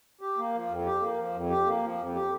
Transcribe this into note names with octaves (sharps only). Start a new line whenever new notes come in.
G4
A#3
F3
F2
G4
A#3
F3
F2
G4
A#3
F3
F2
G4